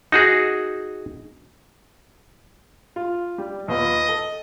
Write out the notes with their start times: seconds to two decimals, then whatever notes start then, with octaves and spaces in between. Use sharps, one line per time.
0.12 D#4 F#4 G#4
2.96 F4
3.38 G3
3.68 D#2 B3 F4 D#5
4.09 A4